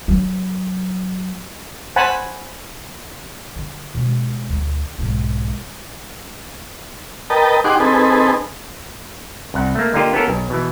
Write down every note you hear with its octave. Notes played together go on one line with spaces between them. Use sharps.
F#3
C5 F#5 G#5 A5 B5
D3
B2 G#3
D2
B1 G#2
A#4 B4 D#5 G5 A5
D#4 G4 G#4 F#5 C6 D6
C4 D#4 G#4 A4 B4
C2 F#5
A3 A#3
D3 A#3 D#4 F4 G4
B3 C#4 A4 A#4
B1
B2 E3